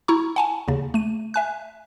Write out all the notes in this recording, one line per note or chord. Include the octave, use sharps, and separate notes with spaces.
E4 A#5 C#6
F#5 G#5 A5
D#2 C#3
A3 D#7
E5 G#5 F#6